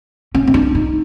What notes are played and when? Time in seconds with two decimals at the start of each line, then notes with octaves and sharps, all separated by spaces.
0.35 C#4
0.48 C#4
0.54 D4
0.75 D#4